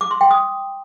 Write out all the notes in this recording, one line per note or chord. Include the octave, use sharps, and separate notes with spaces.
D6
C6
G5
D#6